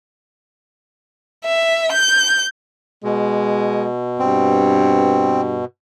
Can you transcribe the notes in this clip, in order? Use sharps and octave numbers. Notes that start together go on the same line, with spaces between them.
E5
G6
B2 G#3
G2 C4